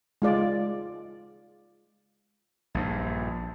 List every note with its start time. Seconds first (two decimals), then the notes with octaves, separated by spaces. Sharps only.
0.22 G#3 F4 D5
2.75 A#1 G2